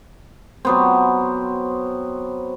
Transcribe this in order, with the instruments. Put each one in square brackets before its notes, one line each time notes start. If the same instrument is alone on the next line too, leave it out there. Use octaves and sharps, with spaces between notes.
[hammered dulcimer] F#3 B3 C4